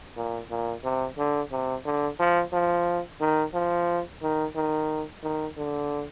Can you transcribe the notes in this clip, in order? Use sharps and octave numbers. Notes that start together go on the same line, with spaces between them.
A#2
A#2
C3
D3
C3
D3
F3
F3
D#3
F3
D#3
D#3
D#3
D3